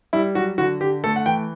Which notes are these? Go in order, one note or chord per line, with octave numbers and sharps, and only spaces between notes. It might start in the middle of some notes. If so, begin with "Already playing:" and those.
G3 E4
F#3 F#4
D3 F#4
D3 G4
A3 A4
F#5
E3 G5